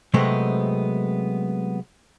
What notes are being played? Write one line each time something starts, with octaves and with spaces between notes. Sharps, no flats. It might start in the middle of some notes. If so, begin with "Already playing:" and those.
C3 F#3 G#3 A3 B3 C4